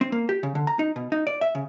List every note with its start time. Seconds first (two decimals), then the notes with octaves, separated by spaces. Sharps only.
0.01 C4
0.12 A#3
0.29 G4
0.43 C#3
0.55 D3
0.67 A#5
0.79 D#4
0.96 B2
1.12 D#4
1.27 D5
1.41 E5
1.55 C#3